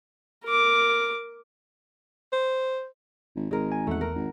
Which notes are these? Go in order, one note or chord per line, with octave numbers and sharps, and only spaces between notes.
A#4 D6
C5
G#1
G#1 G#3 A#4
G#5
E2 A3 F#5
A#4
G#1